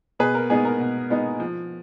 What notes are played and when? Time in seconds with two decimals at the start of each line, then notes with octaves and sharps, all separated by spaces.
0.19 B2 G#4 B4
0.34 A#4
0.50 G#3 B3 D#4 G#4
0.65 A#4
0.79 B2
1.10 G#3 B3 D#4
1.40 F3